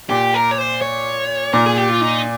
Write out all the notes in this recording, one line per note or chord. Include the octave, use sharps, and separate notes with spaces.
A#2 G4
A#4
C#5
C5
C#5
A#2 A#4
G#4
G4
F4
D#4